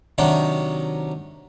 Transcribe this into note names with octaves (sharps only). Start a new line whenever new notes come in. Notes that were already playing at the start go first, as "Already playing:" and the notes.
C3 D#3 F#3 D4 D#4 F#4